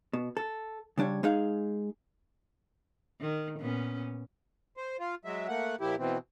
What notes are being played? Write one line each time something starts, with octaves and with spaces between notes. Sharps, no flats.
B2
A4
C#3 G3 D4 C#5
G#3 D#4 G#4 F5
D#3
A#2 B3 C#4
C5
F4
F#3 G#3 E5
A3 A#3 F#5
A#2 F3 E4 G4
B2 E3 C4